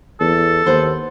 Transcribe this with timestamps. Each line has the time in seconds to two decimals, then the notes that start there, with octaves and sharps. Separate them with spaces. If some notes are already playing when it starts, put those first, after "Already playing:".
0.20 E2 A4
0.66 D#2 B3 C5